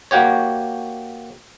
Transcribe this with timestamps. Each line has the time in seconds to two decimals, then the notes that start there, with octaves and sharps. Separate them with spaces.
0.11 A#3 F#4 G4 C#5